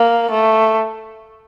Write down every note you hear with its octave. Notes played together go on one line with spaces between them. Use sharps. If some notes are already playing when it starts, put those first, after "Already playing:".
Already playing: A#3
A3